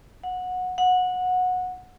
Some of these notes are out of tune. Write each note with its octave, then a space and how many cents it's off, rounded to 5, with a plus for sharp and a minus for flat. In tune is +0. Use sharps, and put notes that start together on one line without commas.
F#5 -20
F#5 -20